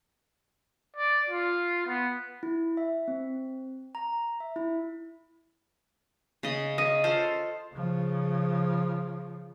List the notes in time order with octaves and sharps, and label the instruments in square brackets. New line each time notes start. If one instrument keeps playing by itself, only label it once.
[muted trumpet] D5
F4
B3
[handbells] E4
E5
C4
A#5
E5
E4
[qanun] C#3 D#5
[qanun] C#4 [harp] D#5
[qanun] F4 A4 C5
[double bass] C#3 F3